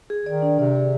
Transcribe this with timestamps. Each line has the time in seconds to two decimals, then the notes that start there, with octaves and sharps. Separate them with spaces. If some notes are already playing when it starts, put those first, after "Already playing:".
0.10 G#4
0.25 D#3 D5
0.42 D4
0.59 C3 D5
0.75 G#4